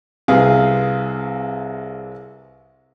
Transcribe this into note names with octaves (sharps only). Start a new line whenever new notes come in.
C2 C3 G#4 B4 F5